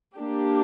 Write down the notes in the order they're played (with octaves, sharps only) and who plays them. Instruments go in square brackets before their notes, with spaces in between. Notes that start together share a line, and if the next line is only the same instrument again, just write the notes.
[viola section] A#3 D4 G4